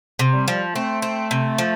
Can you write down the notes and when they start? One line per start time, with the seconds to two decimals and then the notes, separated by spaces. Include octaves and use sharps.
0.19 C3
0.33 G3
0.48 F3
0.75 A3 C4
1.02 C4
1.31 C3
1.58 F3